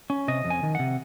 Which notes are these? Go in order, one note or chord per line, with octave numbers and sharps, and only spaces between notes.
C#4
C3 D#5
F2
G#5
D#3
C3 F#5